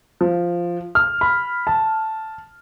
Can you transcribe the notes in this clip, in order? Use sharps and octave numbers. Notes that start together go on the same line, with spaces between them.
F3
F6
B5
A5